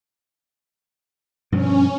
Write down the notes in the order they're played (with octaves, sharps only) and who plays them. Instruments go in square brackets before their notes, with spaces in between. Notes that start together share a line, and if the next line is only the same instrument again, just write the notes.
[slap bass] G2 B2 F3 [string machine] C#4